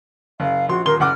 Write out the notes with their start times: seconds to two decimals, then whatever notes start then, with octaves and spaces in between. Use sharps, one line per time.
0.40 F#1 F5
0.69 A#1 F#4 C6
0.86 D#1 A#4 C6 G7
1.00 F#1 F#5 D6 F6